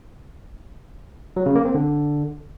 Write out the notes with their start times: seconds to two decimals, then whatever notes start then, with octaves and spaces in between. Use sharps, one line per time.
1.36 F#3
1.46 C#3
1.55 A#3
1.65 C4
1.74 D3